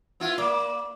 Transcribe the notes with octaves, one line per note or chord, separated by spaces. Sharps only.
B3 E4 F4
A#3 D5 B5 D6